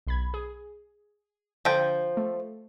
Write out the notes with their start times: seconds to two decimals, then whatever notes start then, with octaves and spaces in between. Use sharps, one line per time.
0.07 B1 B5 G#6
0.34 G#4
1.65 D3 F3 G5
2.17 A3